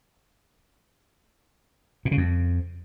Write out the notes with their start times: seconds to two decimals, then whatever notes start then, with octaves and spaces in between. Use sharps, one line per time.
2.05 A#2
2.11 C#3
2.17 F2